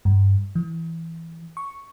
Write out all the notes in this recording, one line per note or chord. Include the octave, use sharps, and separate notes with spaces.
G2
E3
C#6